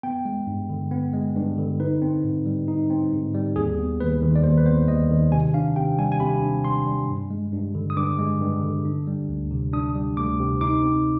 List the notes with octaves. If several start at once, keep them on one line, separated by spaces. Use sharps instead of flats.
B3 G5
G#3
G2
D3
B3
G#3
G2
D3
D#4 B4
C4
G#2
G3
D#4
C4
G#2
G3
D#2 G#4
B3
D#2 B4
D#3
D5
D#2 C5
B4
B3 C5
D#2 D#5
D#3
C3 G#5
D4 F5
C3 G5
G3 G#5
G#5
C3 B5
D4
C3 C6
G3
G2
G#3
G2
D3
D#6
G2 D6
G#3
G2
D3
D4
G3
D2
C3
D4 D#6
G3
D2 D6
C3
D#4 D6
C4